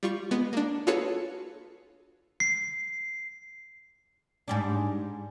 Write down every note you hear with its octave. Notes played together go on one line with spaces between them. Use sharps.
G3 F4 C#6
G#3 B3
A#3 D4
F4 F#4 G#4 A4 B4 C#5
C7
G#2 G3 D4